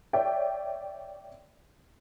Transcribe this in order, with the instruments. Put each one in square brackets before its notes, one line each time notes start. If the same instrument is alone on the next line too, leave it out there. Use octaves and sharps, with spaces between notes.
[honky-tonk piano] C#5 D5 E5 G5